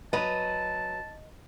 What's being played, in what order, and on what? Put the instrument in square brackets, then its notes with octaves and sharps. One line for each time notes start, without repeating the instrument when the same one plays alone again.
[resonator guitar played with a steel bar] F#3 B4 [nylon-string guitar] D#5 [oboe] A5